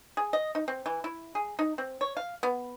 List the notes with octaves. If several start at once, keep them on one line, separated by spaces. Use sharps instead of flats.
G#4
D#5
D#4
C4
E3
E4
G#4
D#4
C4
C#5
F5
B3